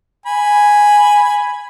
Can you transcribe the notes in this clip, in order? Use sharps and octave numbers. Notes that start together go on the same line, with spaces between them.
G#5 B5